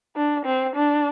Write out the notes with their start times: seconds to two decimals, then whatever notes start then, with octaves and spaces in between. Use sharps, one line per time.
0.17 D4
0.45 C4
0.76 D4